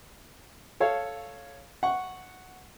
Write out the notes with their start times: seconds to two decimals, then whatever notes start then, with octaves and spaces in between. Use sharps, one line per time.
0.80 A4 C#5 F5
1.83 F#5 C#6